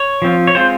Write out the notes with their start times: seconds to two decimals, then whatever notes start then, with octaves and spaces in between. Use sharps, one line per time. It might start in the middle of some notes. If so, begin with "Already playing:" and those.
Already playing: C#5
0.22 F3 C4 F4
0.47 C#5
0.55 G#3 C4 F4 C5